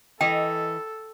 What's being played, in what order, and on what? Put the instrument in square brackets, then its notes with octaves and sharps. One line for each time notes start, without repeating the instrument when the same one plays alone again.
[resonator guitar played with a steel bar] E3 D#5 [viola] A4 [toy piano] G5